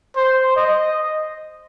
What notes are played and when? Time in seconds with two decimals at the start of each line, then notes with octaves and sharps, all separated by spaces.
0.16 C5
0.56 D#5